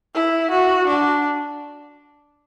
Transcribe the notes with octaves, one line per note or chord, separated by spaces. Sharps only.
E4
F#4
D4